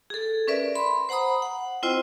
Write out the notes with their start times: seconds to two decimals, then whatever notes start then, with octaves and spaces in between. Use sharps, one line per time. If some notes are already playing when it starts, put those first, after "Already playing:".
0.10 G#4 A4
0.47 C#4 A#4 B4 D5 E5
0.75 B5 C6
1.09 C5 F#5 A#5 B5 D#6
1.42 F#5
1.83 C4 E4 F4 C5 D#5 G5